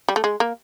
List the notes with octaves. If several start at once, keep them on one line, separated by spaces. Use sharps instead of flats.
G3
A3
G#3
A#3